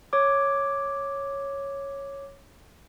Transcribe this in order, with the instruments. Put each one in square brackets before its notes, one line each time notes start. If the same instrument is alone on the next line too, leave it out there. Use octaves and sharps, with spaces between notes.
[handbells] C#5 D6